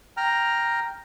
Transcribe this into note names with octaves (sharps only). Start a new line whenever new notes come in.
G5 A#5 F6